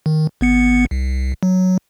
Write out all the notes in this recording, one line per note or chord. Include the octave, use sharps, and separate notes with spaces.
D#3
G#1 B3 C#7
C2
F#3